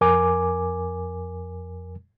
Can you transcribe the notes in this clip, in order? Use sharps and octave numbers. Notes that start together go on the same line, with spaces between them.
F2 A#4 G#5 D6